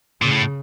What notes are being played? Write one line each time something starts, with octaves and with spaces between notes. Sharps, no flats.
A#2 C#3
A2